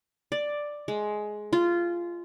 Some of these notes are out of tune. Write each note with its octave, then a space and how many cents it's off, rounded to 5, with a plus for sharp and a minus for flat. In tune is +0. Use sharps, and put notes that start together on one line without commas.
D5 +5
G#3 +15
F4 -15